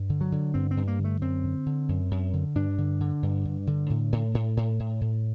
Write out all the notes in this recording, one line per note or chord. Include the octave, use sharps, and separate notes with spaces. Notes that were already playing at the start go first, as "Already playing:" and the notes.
Already playing: G2
D3
F#3
D3
G2 C4
C4
G2
A#3
D3
A3
F#2 C4
D3
D3
F#2
F#2
D3
G2 D4
D3
D3
G2
G2
D3
A2
A2
A2
A2
A2
A2